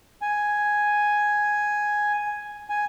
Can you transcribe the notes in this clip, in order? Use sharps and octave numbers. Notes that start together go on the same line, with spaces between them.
G#5
G#5